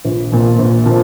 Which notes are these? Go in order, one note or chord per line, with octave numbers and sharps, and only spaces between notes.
A#1
A#2 F3
A#1
A#2 F3